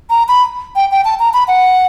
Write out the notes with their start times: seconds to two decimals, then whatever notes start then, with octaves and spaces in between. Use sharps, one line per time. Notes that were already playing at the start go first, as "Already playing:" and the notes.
0.10 A#5
0.29 B5
0.76 G5
0.91 G5
1.05 A5
1.19 A#5
1.34 B5
1.48 F#5